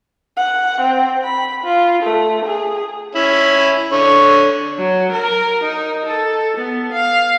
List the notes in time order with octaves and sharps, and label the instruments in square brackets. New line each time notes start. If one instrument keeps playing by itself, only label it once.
[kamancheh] F#5
C4
B5
F4
A3
G#4
[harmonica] C#4 E4
D3 C#5
[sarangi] F#3
A#4
D#4
A4
B3
F5